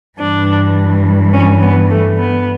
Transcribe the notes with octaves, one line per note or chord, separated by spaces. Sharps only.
G2 E3 D4
C#4
B3
A3
B3